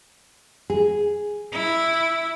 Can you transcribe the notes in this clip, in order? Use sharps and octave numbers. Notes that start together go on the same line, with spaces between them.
G#4
E4